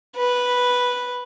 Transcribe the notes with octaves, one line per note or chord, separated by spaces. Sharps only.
B4